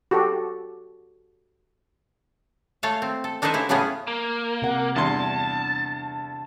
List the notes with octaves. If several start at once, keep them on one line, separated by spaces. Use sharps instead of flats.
F#4 G4 A4
A3 A4 C#5 F5 A5
C4
A4
D4 D#4 A4 B4 C5 E5
C#3 E4 G4
A2 C#3 G3 B3 C#4 G#4
A#3
C3 F#5
E2 G2 D4 A5 C6